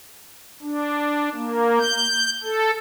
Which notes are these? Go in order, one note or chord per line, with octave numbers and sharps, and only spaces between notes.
D4
A#3
G6
A4